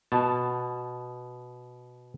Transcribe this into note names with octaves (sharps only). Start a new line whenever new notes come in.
B2 A5